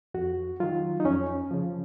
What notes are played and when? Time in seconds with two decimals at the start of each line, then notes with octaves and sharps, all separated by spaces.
0.14 F2 F#4
0.60 D#3 F#3 F4
1.00 D#4
1.05 F2 C#4
1.51 C#3 F3